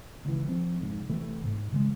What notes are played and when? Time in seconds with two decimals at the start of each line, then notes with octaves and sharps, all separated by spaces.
0.25 C#2 E3
0.48 F3 C4
0.81 F1 G#2
1.09 E2 C3 E3 A3
1.44 G#2
1.72 C#3 E3 F3 G#3